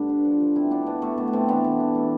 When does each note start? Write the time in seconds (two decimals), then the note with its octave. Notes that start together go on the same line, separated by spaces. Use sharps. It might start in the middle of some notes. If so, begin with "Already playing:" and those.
Already playing: G2 A3 B3 D4
0.09 D3
0.25 F3
0.40 F3
0.55 B2 C4 E4
0.71 B2 B3 D4
0.86 B2 B3 D4
1.02 B2 A3
1.18 B2 A3
1.28 B3
1.33 B2 A3 C4
1.48 E3 B3 D4
1.64 E3
1.80 E3
1.95 A3